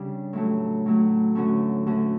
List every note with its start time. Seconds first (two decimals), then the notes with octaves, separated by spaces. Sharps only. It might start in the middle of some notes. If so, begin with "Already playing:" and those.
Already playing: C#3 G3 D4
0.33 A2 F#3 A3
0.86 A2 F#3 A3
1.35 D2 D3 A3 C#4 F#4
1.86 D2 D3 A3 C#4 F#4